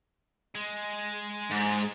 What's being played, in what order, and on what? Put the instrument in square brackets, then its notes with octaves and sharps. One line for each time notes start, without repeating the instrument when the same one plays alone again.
[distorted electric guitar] G#3
[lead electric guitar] G#2